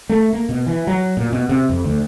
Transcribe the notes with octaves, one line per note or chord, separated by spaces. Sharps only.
A3
A#3
B2
E3
F#3
A#2
B2
C3
F2
D2